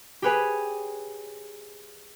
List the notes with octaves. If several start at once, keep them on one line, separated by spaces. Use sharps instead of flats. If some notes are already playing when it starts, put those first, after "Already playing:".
G4 G#4 B4 C#5 G#5